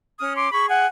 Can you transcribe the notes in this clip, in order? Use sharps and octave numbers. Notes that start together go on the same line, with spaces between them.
C#4 D#6 F6
C6 D6
G#4 B5 C#6
F#5 G#5